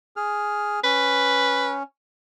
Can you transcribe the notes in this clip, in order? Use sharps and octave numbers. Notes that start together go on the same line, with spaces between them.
G#4 F6
C#4 B4